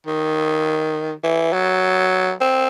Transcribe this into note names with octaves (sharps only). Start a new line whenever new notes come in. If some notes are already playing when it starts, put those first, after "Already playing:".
D#3
E3
F#3
C4